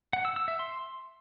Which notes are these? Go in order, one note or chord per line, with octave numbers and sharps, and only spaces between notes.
F#5
E6
E6
E5
C6